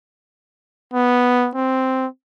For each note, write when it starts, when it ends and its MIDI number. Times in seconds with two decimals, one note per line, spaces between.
0.94 1.50 59
1.55 2.06 60